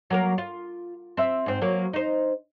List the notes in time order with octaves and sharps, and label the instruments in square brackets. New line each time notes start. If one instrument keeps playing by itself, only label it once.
[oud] F#3 A#3 A#4
F4
C4 E5
G#2 C4
F#3 A#3
D#4 C5